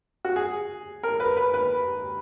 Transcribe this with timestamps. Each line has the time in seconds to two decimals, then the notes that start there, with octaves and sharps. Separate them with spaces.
0.25 F#4
0.36 G#4
1.03 A#4
1.20 B4
1.37 B4
1.54 B4